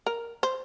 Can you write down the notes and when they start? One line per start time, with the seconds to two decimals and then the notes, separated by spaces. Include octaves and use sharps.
0.06 A#4
0.43 C5